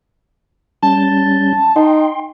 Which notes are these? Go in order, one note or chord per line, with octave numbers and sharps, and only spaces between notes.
G3 C#4 A5 G6
D#4 G5 C6